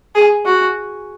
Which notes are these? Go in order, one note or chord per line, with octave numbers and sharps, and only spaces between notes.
G#4
F#4